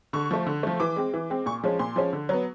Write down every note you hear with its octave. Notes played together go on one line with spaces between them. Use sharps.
D3 C#6
F3 A3
D3
F3 A3
E3 D6
G#3 C4
E3
G#3 C4
A#2 C#6
F3 G#3 C#4
A#2 C6
F3 G#3 C#4
D3
F#3 B3